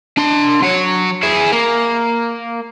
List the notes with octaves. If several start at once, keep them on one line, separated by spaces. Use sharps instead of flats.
D4 C6
F#3 C#5
E4 G#4
A#3